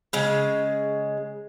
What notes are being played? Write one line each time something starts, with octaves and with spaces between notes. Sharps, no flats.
C#3 G#3